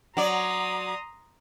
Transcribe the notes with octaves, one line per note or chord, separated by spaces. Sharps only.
F#3 D5 A#5 C6 D#6